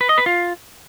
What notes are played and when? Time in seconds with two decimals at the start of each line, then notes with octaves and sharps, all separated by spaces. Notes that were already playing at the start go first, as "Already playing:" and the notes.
0.01 B4
0.09 D#5
0.18 B4
0.26 F4